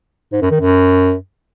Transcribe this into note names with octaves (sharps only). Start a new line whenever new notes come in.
G#2
F#2
D#3
F#2